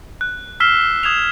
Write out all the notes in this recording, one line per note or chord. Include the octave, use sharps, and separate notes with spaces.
F#6
E6 F6 B6 C7 E7 G7
D#6 G#6 E7 F7